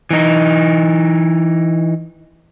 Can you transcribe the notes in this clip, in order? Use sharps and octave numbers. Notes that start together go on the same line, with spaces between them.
E3 D#4